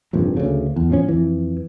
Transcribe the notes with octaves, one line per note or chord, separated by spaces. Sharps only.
F1 A#1 G2
D2 C#3
E2
A2 F3 C4 C#4
F2 E3